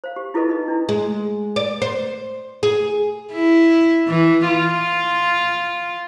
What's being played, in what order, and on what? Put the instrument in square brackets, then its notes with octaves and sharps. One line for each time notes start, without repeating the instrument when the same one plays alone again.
[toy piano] C5 F5
G4
E4 F4 G#4 A4 B4 D#5
D#4 B4 D#5
D4 E4
[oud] G#3
D5
C5
G#4
[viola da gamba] E4
E3
F4